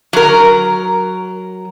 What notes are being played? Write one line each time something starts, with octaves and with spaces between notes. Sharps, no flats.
F#3 A#4